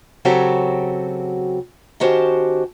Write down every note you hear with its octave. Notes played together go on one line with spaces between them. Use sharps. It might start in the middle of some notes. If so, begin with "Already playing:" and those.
C#3 F#3 C4 F#4 G4 A4
D#3 C#4 F#4 G4 C5 A5